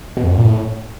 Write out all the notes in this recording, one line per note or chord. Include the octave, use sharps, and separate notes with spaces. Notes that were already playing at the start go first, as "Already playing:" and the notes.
B2
F2
F#2
A#2
A2